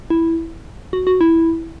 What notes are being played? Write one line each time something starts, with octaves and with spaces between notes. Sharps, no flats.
E4
F#4
F#4
E4